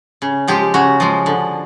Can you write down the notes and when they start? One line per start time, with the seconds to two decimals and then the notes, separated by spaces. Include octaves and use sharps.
0.22 C#3
0.48 F3 G#3 G4
0.74 C#3 F#4
1.00 F3 G#3
1.26 D3